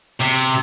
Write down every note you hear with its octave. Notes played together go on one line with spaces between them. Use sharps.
C3